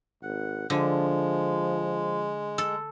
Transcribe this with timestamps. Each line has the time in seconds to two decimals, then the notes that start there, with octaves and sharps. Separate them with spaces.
0.23 G#1 F#5
0.70 D3 F3 G#3
2.58 A4